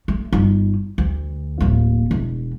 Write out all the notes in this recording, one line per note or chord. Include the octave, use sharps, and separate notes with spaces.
A3
G1 D#4
D2
D1 A#3
E1